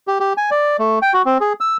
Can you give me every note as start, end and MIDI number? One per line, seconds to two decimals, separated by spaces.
0.07 0.18 67
0.20 0.33 67
0.37 0.50 80
0.51 0.77 74
0.79 0.99 57
1.02 1.13 79
1.14 1.22 66
1.25 1.38 60
1.41 1.53 68
1.60 1.77 88